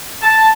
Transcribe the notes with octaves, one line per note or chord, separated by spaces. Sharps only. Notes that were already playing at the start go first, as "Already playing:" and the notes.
A5